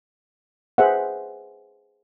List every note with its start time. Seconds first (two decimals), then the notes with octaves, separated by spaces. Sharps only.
0.78 G#4 B4 C5 E5 F#5